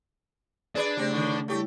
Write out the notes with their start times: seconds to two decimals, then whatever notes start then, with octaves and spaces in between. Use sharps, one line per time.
0.75 D4 G#4 B4 D5
0.97 C#3 G3 A3 C4
1.11 A2 D3 D#3
1.48 G3 A3 E4 G4 C#5